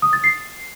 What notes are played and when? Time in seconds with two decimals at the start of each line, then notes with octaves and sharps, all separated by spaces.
0.02 D#6
0.13 A6
0.24 C7